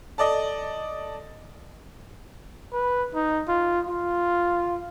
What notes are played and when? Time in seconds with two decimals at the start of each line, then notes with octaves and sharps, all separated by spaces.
0.18 A4 D5 D#5
2.73 B4
3.15 D#4
3.48 F4
3.89 F4